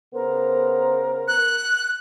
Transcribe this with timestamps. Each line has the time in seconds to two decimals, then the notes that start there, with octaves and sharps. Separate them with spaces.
0.14 C#3 B3 A#4 C5
1.28 F#6